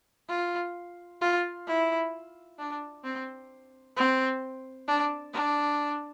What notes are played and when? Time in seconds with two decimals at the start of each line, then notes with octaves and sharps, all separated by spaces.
0.29 F4
1.21 F4
1.67 E4
2.59 D4
3.04 C4
3.96 C4
4.88 D4
5.33 D4